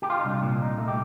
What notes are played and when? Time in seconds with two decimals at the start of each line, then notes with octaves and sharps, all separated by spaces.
0.02 G4
0.10 F4
0.18 D#4
0.25 C2 D4
0.43 A#2
0.60 C2 D#4
0.77 A3
0.88 G4